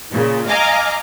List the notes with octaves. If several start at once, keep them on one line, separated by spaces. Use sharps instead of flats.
A#2 C#3
D#5 F5 G#5 A#5 D6